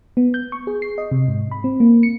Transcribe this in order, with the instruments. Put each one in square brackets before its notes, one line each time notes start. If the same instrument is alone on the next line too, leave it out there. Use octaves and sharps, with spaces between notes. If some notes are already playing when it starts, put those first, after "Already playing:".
[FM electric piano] B3
G6
C#6
G#4
C7
D#5
C3
G#2
B5
C4
A#3
C#7